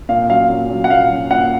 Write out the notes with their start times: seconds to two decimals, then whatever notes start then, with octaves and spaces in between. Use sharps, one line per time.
0.09 A#2 F5
0.29 F#3 C#4 F5
0.50 A#2
0.69 F#3 C#4
0.84 F#5
0.90 A#2 F5
1.10 F#3 C#4
1.30 A#2 F#5